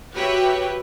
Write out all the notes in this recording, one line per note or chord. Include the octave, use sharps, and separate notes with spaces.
F#4 G4 B4 C#5 E5 G5